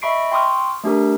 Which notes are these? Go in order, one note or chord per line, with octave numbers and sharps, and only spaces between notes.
D#5 E5 B5 C#6 C7 D7
G5 C6 C#6 D#6 F6
A3 D4 G4 A#4